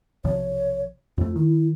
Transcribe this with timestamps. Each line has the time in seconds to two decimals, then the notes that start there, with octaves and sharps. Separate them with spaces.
0.24 B1 C3 F3 C#5
1.18 F2 A3 F4
1.36 D#3 E4